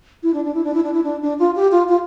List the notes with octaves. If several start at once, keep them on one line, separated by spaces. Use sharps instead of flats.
E4
D4
D4
E4
D4
E4
D4
E4
D4
D4
F4
G4
F4
F4